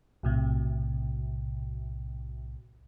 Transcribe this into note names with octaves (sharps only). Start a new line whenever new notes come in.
B1 A2 C3